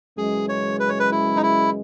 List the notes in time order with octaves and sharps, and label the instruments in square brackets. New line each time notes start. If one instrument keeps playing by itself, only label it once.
[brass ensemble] F#2 C#3 E3 G#3 [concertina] G#4
[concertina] C#5
B4
C#5
B4
E4
D#4
E4